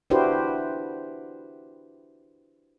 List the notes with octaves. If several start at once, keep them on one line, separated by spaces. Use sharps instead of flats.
D4 E4 F#4 G4 B4 C5